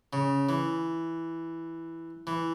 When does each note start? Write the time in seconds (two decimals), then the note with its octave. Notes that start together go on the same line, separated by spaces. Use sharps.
0.13 C#3
0.49 E3
2.27 E3